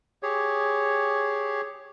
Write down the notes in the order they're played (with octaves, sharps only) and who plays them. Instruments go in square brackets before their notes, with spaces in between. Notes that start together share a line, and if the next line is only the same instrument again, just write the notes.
[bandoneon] G4 G#4 C#5